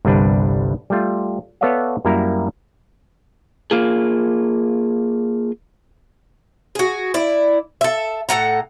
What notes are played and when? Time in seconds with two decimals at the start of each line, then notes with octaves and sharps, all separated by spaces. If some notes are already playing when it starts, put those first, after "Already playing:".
0.05 G1 C2 G3 D4 B4
0.90 G3 A3 F4
1.61 B3 A4 C#5 D5 E5 F5
2.05 F#2 G3 A#3 E4 A#5
3.71 A#3 F4 G#4
6.75 F#4 G#4
7.14 E4 D5
7.81 A4 E5
8.29 A2 A4 F#5 A#5